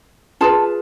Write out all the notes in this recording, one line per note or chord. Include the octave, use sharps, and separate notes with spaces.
F4 G#4 B4 A5